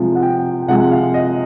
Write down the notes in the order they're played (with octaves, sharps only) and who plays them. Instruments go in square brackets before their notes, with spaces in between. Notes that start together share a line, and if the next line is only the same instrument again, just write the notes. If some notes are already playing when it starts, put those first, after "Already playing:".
Already playing: [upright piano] C3 F3 G#3
F#5
G5
G5
C3 F3 G#3 F#5
F5
D#5